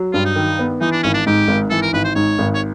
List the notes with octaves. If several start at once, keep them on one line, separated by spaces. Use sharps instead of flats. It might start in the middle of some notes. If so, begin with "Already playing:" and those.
Already playing: F#3
G2 F4
D#4
D#3
B3
E3 D#4
D4
G#1 C#4
D4
G#2 G4
G#1
E3 A4
A#4
G#1 B4
C5
G#2 C#5
G#1
C#5